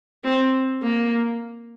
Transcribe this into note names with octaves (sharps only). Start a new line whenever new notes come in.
C4
A#3